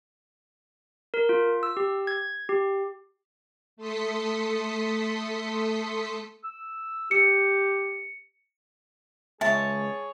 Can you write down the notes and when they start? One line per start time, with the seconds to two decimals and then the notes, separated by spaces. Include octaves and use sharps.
1.14 A#4
1.29 F4
1.63 E6
1.77 G4
2.07 G#6
2.49 G4
3.77 A3 A4 C6 D#6 B6 C#7
6.44 E6
7.11 G4 C#7
9.41 C#2 G#4 C#5 E5 A5